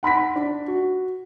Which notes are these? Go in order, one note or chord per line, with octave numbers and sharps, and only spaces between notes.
F#5 B5 A#6 B6
D4
F#4